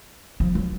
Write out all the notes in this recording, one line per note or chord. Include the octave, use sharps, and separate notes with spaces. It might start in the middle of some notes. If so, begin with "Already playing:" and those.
F3
F#3